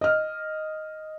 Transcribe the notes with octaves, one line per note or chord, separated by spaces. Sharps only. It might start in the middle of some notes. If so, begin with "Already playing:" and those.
D#5 F6